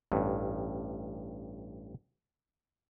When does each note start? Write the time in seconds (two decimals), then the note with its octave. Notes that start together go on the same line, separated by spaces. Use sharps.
0.12 A1 G2